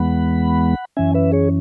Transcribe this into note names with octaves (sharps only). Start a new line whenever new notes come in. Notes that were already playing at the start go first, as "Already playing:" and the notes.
Already playing: E2 E3 G#3 B3 F#5 B5
F#2 E3 C#4 E5 G#5
B4 E5
G#4 C#5